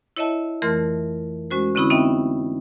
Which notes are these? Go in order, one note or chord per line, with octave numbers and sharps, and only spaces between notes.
E4 C#5 D#5 E5 A5
F2 E3 A3 A#4 C6 F6
G#3 C#4 F#4 C5
D3 C4 C#4 E4 B5 D#6
B3 C4 D#4 D#5 E5 G5